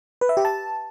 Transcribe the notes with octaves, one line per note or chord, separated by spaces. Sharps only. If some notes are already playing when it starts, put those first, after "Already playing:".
B4
E5
G4
A5